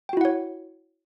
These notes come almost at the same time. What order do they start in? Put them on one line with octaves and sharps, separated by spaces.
G5 F#4 E4 F#5 C#5